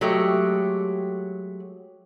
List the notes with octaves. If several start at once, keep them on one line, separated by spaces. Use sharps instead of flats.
F#3 G#3 A3 G4